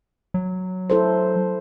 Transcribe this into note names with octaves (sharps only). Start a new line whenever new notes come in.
F#3
E4 A4 C5